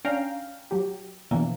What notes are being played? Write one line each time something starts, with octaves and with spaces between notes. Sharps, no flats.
C#4 D4 F5 G5 A#5
F#3 G4
B2 D3 E3 F3 A#3